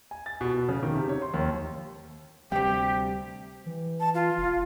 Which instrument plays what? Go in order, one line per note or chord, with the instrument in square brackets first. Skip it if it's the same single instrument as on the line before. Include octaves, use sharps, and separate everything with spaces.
[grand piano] G#5
A6
B2
B2
C#3
D#3
C3
C#5
C6
D#2
[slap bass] D2 G3 [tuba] C3 [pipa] C4 G5 [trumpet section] G4
[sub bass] E3
[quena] A5
F4
[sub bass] F1